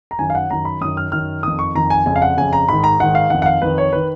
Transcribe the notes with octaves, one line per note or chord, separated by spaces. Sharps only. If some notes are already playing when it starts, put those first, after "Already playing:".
A#5
F#2 D#3 G#5
F5
F#5
F#2 D#3 A#5
B5
F#2 D#3 D#6
F6
F#2 D#3 F6
F2 D#3 D#6
C#6
F2 D#3 A#5
G#5
F2 C#3 G#5
F5
F#5
F2 C#3 G#5
A#5
G#2 D#3 B5
A#5
G#2 D#3 F#5
F5
F2 D#3 F#5
F#5
F5
F2 D#3 B4
C#5
D#3 B4